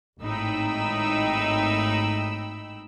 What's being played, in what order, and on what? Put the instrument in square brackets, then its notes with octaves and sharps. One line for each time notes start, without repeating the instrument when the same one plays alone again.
[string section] G#1 A2 D#4 G5 B5 E6